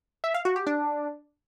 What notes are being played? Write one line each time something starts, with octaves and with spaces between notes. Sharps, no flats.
E5
F5
F#4
G4
D4